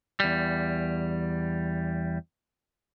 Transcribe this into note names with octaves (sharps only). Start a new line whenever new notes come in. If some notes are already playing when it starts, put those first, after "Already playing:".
E2 G3